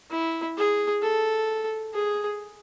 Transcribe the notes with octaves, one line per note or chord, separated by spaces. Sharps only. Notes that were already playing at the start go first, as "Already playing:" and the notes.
E4
G#4
A4
G#4